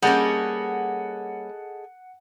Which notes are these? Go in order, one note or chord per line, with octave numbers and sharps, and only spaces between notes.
G3 A#3 C#4 G#4 A4 D#5 F#5